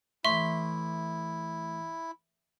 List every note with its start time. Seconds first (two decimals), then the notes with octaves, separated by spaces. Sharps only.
0.25 A2 E3 E4 E5 C6 C#6